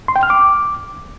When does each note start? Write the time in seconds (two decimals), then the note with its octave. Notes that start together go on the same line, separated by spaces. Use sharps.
0.08 C6
0.16 G5
0.23 F6
0.30 D6